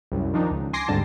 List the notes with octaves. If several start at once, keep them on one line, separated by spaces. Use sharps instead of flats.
C2 F#2
D#3 F3 D4 D#4
C#2
G#5 C6 D6 A#6 C7 D7
D2 G#2 D3 G3 C4 A5